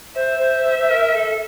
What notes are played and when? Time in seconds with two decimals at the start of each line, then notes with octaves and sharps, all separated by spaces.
0.15 C5 E5
0.40 C5
0.65 C5
0.78 C5
0.90 A#4
1.14 A4